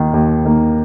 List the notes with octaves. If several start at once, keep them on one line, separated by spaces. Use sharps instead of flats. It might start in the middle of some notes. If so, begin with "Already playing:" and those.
Already playing: D#2 D#3 A#3
D#2
D#3 A#3